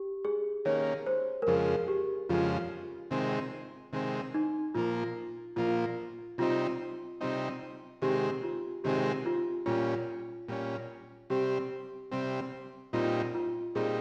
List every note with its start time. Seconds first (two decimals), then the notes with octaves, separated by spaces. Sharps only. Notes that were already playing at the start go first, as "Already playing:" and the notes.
Already playing: G4
0.25 G#4
0.65 D#3 A#3 C#4 C#5
1.06 C5
1.42 A#4
1.47 F2 C#3 F3 G#3 G#4
1.88 G4
2.29 F2 C#3 F3 G#3 F4
3.11 C3 D#3 G#3 C4
3.93 C3 D#3 G#3 C4
4.34 D#4
4.75 A#2 F3 A#3 F4
5.56 A#2 F3 A#3 F4
6.38 C3 G3 C4 D#4 F4
7.21 C3 G3 C4 D#4
8.02 C3 D#3 G#3 C4 G4
8.43 F4
8.84 C3 D#3 G#3 C4 G4
9.26 F4
9.66 A#2 G3 C#4 F4
10.48 A#2 G3 C#4
11.30 C3 G3 C4 G4
12.12 C3 G3 C4
12.93 A#2 G3 C4 D#4 F4
13.35 F4
13.75 A#2 G3 C4 D#4 G#4